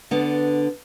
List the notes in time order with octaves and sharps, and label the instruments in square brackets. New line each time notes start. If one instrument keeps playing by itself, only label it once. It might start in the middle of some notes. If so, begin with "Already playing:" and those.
[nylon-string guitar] D3 B3 D4